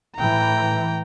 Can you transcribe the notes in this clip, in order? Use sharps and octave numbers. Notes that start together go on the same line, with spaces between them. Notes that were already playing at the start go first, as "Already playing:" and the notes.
A2 E3 G5 A#5